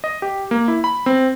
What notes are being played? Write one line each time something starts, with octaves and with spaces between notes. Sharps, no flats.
D#5
G4
A#3
E4
B5
C4